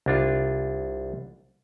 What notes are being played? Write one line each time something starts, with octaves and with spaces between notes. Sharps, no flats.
C2 D4 F4